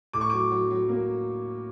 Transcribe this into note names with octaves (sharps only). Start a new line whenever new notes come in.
A2 D6
C#6
F#3 D6
F#3
F#3
A#3